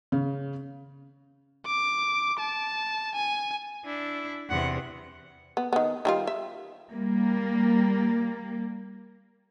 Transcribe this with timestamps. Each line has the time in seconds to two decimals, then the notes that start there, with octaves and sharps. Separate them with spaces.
0.12 C#3
1.67 D6
2.39 A5
3.16 G#5
3.85 D4 E4
4.50 E2 C3 F#5
5.57 B3
5.73 D#3 B3
6.05 D#3 G3 F4
6.27 E5
6.91 G3 A#3